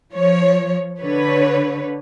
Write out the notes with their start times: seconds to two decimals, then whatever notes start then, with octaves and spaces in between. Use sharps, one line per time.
0.12 F3 C#5
1.00 D3 B4 C#5